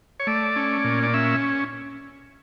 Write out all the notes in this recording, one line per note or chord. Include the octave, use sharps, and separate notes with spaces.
C#5
A3 D5
C#4
A#2
D5
C#4 E5